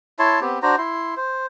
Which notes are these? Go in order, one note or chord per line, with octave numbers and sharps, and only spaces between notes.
E4 C#5 A5 C6
B3 C4 G4
D4 F#4 C5 A#5
E4 C6
C5